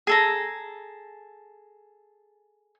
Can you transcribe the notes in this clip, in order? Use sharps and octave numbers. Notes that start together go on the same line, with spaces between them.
G#4 A4 A#5